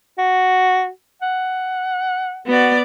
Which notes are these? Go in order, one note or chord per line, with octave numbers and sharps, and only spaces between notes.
F#4
F#5
B3 F#4 D5